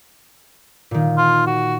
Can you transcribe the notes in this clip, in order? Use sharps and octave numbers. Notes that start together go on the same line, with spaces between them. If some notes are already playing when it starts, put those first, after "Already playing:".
A#2 D#3
F4
F#4